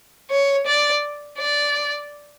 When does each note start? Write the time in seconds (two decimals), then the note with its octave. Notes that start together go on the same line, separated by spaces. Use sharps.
0.30 C#5
0.67 D5
1.39 D5